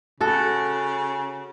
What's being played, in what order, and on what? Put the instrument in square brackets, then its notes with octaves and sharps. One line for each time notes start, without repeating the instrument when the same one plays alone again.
[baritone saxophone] C#3 [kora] F#4 A4